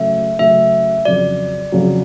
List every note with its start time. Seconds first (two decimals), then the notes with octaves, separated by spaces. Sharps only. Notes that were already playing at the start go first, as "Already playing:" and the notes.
Already playing: C#3 F#3 A3 C#4 E5
0.39 C#3 F#3 A3 C#4 E5
1.05 F2 C#3 F#3 D5
1.72 F2 C#3 F#3